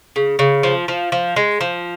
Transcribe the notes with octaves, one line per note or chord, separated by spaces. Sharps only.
C#3
C#3
F3
F3
F3
G#3
F3